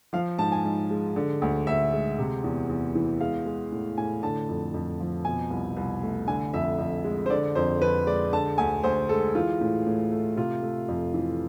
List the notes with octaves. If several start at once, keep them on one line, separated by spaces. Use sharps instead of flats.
F3 F5
G#2 A5
G#5
G#2
G#3
D3
D2
D2 E5
G#3
C3
E2
E2
E3
G#3 F5
G#3
A2
A2 G#5
D3 A5
F2
F2
F3
B2 G#5
C2
C2
A3
D3 G#5
F2 E5
F2
G#3
C5
D3 D5
F2 C5
F2 B4
G#3 D5
D3 A5
D2 G#5
D2 C5
G#3 A4
E3 F4
A2
A2
A3
C3 F4
A3
F2
E3